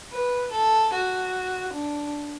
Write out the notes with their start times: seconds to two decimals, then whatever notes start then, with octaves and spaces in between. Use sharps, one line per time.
0.12 B4
0.52 A4
0.93 F#4
1.73 D4